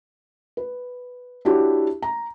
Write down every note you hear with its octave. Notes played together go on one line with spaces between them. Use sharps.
B4
D4 E4 F#4 G4 C#5
A#5